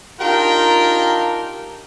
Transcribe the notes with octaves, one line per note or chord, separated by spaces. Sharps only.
D4 D#4 F4 G4 A#4 G5